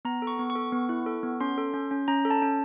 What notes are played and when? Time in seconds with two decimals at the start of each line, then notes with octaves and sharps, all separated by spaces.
0.05 B3 A#5
0.22 A4
0.27 C#6
0.39 B3
0.50 C#6
0.55 A4
0.72 B3
0.89 E4
1.06 A4
1.23 B3
1.41 C#4 C6
1.58 A4
1.74 C#4
1.91 C#4
2.08 C#4 A#5
2.25 A4
2.30 A5
2.42 C#4